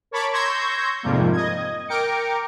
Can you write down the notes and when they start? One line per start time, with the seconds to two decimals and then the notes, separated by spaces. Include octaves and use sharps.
0.11 A#4 C#5 A5 B5 C#6 D6
0.33 C6 C#6 E6 G6 G#6 A#6
1.03 F2 G#2 C3 F3 G3 A#3
1.32 D#5 G#6
1.88 A#4 G5 D6 C#7